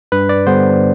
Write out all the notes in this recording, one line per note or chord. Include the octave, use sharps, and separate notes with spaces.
G2 B4
D5
D3 G3 B3 C5